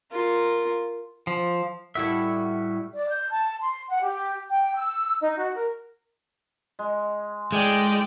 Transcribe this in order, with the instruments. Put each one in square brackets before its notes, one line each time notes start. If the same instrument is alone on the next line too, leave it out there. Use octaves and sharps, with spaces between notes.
[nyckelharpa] F4 A#4
[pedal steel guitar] F3
[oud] A2 E4 A4 [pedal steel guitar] G3 F#4 E5
[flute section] D5
G6
A5
C6
F#5
G4
G5
E6
D#4
F#4
A#4
[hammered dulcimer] G#3
[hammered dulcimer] A2 [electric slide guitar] G#3 [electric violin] D5 G5